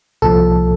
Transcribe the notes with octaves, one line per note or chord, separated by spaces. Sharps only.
C2 A#2 F3 A4